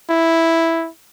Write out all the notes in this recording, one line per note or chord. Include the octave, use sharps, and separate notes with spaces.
E4